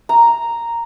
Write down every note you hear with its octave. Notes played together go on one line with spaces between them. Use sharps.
A#5